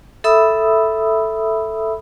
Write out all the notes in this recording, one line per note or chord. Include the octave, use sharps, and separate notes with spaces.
A4 E5 B5 D#6 E6